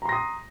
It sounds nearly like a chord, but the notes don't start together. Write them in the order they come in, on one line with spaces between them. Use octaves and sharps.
A#5 C6 A#6 D#6